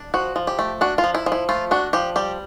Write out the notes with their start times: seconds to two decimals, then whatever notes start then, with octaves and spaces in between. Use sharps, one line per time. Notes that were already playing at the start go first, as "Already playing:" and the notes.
Already playing: D4
0.14 F3 F#4
0.36 F3
0.47 G4
0.59 A3
0.81 D4 F#4
0.98 F4
1.04 F3
1.15 E4
1.26 F3
1.32 E4
1.49 A3 F4
1.71 D4 F#4
1.93 F3 G4
2.16 G3 G4